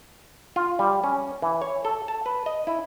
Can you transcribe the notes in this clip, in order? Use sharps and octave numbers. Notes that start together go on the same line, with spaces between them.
F4
G3
C#4
E3
C#5
A4
A5
B4
D#5
E4